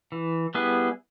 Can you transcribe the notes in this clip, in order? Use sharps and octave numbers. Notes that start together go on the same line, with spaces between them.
E3
G3 B3 E4 G#4